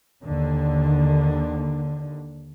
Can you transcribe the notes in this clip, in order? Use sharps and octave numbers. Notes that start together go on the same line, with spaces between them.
D#2 D3